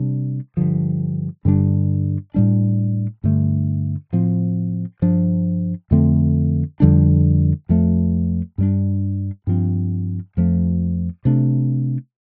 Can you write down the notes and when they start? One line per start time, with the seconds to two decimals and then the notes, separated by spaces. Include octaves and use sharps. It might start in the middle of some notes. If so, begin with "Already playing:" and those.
Already playing: C3 G3 D4
0.57 G2 D3 F3
1.45 G2 D3 G3 D4
2.34 A2 G3 D4
3.24 G2 D3 A3
4.13 A2 F3 C4
5.02 G2 F3 D4
5.91 F2 D3 A3 C4
6.80 F2 D3 G3 D4
7.69 F2 F3 A3
8.58 G2 G3 D4
9.47 G2 F3 C4
10.37 F2 F3 A3
11.25 C3 A3 D4